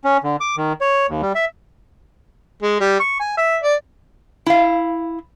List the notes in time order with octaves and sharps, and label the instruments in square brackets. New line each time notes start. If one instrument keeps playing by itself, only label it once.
[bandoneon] C#4
D3
D6
D#3
C#5
D#2
G3
E5
[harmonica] G#3
G3
C#6
G#5
E5
D5
[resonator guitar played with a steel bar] E4 F5